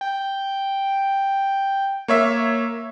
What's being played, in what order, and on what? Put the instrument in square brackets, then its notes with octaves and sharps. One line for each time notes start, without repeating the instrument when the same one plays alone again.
[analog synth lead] G5
[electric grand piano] A#3 C#5 E5